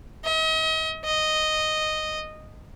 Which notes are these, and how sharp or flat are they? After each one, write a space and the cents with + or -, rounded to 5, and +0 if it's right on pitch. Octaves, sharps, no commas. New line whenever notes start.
D#5 +40
D#5 -5